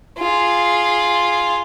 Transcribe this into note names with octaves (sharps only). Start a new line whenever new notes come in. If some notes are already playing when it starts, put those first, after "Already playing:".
F4 G#4